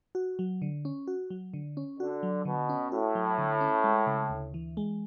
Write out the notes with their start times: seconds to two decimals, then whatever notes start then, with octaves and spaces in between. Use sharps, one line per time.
0.15 F#4
0.39 F#3
0.62 D3
0.85 C#4
1.07 F#4
1.30 F#3
1.54 D3
1.77 C#4
2.00 D3 F#4
2.23 F#3
2.45 B2 D3
2.69 C#4
2.92 A2 F#4
3.15 F#3
3.38 D3
3.61 C#4
3.84 G#3
4.07 C#3
4.30 D2
4.54 E3
4.77 G#3